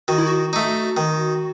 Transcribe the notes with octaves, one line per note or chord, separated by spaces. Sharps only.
D#3 F#4
E4
F#4
A3 D#4
D#3